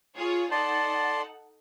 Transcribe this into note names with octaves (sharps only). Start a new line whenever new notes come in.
F4 G#4 C#5
D#4 A4 D5 F#5 A5 C6